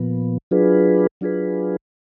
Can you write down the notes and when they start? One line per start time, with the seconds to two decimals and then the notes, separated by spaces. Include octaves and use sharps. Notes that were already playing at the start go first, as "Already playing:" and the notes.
Already playing: A#2 F3 B3
0.51 F#3 D4 F4 G#4 B4
1.21 F#3 D4 F4 G#4 B4